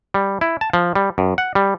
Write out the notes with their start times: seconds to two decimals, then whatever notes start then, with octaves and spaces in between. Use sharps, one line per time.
0.14 G3
0.41 E4
0.61 A5
0.73 F3
0.95 G3
1.18 F#2
1.38 F#5
1.55 G3